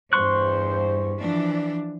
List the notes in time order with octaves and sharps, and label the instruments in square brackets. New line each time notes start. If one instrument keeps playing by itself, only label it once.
[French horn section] E2 C5 [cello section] G2 [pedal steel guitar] C6 C#6 F#6
[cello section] E3 F3 D4